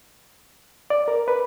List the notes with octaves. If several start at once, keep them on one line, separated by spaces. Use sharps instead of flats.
D5
A#4
B4